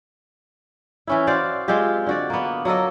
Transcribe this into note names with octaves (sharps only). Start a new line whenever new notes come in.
E3 C#4 E4
F#4 C5 D5 F5
G#3 C4 F4 G4
D3 F#4 D5
A#3 B3
F#3 A#3 A4 D#5